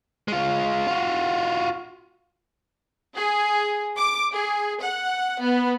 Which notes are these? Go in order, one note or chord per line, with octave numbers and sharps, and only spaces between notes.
G#3 F4
F4 F#4
G#4
D6
G#4
F#5
B3